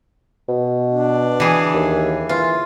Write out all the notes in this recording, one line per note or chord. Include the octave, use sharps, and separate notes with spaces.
B2
D4
E3 G#4
D#2
E3 F4